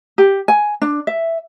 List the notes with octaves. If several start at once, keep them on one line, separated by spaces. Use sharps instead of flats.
G4
G#5
D4
E5